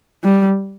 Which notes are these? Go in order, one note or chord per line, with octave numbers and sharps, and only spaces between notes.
G3